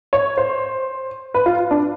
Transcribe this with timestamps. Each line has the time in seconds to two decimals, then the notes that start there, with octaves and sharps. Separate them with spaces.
0.13 C#5
0.37 C5
1.34 B4
1.46 F4
1.71 D4